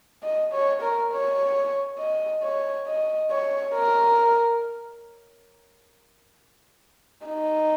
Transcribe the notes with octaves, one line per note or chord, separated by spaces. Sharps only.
D#5
C#5
A#4
C#5
D#5
C#5
D#5
C#5
A#4
D#4